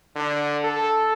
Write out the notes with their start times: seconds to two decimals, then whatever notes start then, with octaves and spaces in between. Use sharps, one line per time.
0.16 D3
0.64 A4